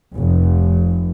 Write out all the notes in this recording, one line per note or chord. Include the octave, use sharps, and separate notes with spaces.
F1